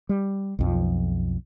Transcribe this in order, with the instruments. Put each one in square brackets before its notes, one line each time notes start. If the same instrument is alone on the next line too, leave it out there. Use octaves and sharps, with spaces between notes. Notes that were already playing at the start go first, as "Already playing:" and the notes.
[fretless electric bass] G3
B1 F2 F3